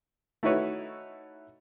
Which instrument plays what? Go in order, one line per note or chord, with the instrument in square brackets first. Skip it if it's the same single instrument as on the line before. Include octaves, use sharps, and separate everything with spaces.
[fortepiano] A3 D#4 E4 F#4 B4 C#5